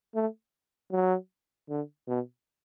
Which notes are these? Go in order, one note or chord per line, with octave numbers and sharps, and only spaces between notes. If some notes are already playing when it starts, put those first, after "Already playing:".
A3
F#3
D3
B2